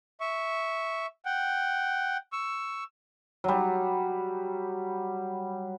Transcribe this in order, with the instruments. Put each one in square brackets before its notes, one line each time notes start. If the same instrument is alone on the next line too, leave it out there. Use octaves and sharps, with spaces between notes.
[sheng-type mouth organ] E5 C#6
F#5 G5
C#6 E6
[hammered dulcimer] F#3 G3